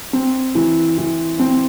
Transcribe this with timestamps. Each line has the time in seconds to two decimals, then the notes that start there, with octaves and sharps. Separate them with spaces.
0.13 C4
0.55 E3
0.98 E3
1.39 C4